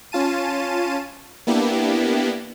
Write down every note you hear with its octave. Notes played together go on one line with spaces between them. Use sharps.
C#4 F4 A5 D#7
A#3 B3 D4 E4 G4